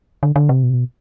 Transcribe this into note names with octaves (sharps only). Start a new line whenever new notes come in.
D3
D3
C3
B2
C3
B2